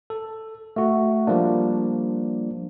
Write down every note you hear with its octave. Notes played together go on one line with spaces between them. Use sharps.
A4
A3 F#4
F3 G3 A#3 D4